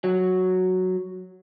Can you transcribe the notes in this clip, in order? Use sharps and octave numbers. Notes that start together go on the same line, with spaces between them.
F#3